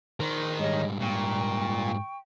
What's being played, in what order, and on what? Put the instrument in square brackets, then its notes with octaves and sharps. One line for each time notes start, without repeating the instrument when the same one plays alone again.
[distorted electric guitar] D#3 [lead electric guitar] A#4 C5
[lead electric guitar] G#2 G3 [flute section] G#4 C#5 D#5
[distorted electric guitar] A#2 [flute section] G5 C#6